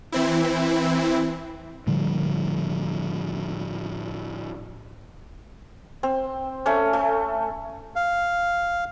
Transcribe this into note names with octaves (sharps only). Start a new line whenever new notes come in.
E3 C4 E4
A2 D3 F3 G3
C4
A3 C#4
A3
F5